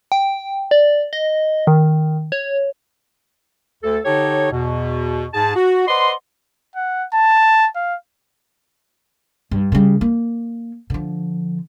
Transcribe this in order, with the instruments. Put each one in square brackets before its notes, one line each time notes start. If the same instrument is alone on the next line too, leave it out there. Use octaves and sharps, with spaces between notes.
[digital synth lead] G5
D5
D#5
D#3
C#5
[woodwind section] D2 A4
D3 D#4 G4 A4 C#5
E2 B2
G#2 G#4 A5
F#4
B4 C5 D5 D#5 F#5 C6
[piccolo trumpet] F#5
A5
F5
[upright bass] G2
C#3 G3
A#3
D3 F3